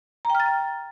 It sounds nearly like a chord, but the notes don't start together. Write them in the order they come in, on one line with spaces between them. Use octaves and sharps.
A#5 G5 F6 A6